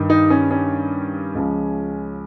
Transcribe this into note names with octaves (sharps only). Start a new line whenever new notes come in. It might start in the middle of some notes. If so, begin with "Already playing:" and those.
Already playing: G2 D#3
D#4
C#4
C#4
C#2 C#3 F3